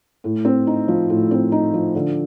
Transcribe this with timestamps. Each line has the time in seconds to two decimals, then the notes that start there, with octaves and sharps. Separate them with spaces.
0.24 A2
0.45 C4
0.67 D#4
0.88 F3
1.10 A2
1.31 C4
1.52 D#4
1.74 F3
1.95 D3